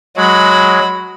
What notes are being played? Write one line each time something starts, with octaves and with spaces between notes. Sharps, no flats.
F#3 G#3 F#4 B5